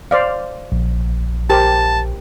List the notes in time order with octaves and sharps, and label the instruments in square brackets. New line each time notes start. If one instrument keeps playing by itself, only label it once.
[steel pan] C5 D5 F5
[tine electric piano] A#1
[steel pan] G4 A#4 C5 [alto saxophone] A5